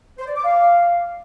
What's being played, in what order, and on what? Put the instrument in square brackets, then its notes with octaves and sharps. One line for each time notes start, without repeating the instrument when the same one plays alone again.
[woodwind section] C5
D5
D6
F5